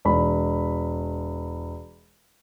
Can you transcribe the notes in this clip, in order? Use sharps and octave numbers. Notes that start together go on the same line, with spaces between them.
E1 B5